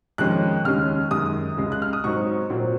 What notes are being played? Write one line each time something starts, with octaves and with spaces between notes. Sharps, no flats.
F2 D#3 G#3 C#4 F#6
D#2 C#3 G#3 C#4 F6
F#2 D#3 G#3 D#6
C#2 C#3 G#3
F#6
F6
D#6
G#2 F#3 C4 D#4 C#6
A#2 F#3 C4